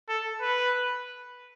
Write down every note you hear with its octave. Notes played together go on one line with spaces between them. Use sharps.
A4
B4